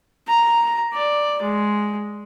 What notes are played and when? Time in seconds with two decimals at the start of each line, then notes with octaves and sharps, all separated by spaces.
0.28 A#5
0.93 D5
1.43 G#3